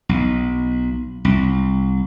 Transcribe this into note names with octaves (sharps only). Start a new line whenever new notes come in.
B1
C2